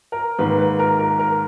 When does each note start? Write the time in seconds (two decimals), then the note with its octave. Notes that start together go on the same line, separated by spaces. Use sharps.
0.12 A#4
0.39 G#2 D#3 A#3 B4
0.59 B4
0.79 A#4
0.99 A#4
1.19 A#4